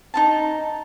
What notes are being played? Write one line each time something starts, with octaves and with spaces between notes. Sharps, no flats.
D#4 F4 A5